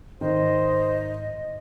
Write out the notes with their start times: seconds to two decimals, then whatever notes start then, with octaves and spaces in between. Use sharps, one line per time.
0.21 G#2 D#3 C5 D#5